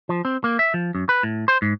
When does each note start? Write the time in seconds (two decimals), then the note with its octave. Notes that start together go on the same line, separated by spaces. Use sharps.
0.09 F3
0.25 C4
0.44 A#3
0.59 E5
0.74 F3
0.95 F#2
1.09 B4
1.23 A2
1.48 C5
1.62 G#2